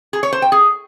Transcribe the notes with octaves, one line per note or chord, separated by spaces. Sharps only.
G#4
C#5
C5
G5
G#4